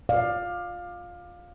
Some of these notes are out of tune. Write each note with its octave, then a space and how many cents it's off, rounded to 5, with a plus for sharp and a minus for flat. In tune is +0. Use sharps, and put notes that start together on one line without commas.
D5 +20 F5 +15